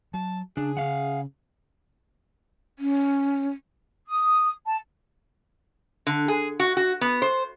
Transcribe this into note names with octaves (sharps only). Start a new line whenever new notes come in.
F#3 A5
C#3 D4 G#4
C#3 C#4 F5 F#5
C#4
D#6
A5
D3
G#4
F#4
F#4
B3
C5